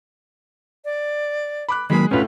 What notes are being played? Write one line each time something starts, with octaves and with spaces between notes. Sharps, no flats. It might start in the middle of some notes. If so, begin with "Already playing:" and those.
D5
B5 D6 F#6
D#3 F#3 G#3 A#3 G#4 B5
D2 A2 C#4 F4 B4